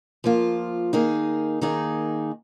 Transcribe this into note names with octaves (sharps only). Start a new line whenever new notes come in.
F3 A#3 F4
D#3 A#3 D#4 G#4
D#3 A#3 D#4 G#4